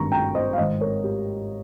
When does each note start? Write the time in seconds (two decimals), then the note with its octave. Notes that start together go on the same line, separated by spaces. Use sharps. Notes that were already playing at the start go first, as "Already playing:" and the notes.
Already playing: G#1 G2 D#3 A#5 C#6
0.12 G5 A#5
0.35 C5 D#5
0.53 F5
0.58 G#1 G#2 D#3 C5 D#5
0.81 A#4 C#5
1.04 G4